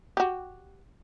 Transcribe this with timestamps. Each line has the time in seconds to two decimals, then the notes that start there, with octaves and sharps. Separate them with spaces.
0.17 F#4 G4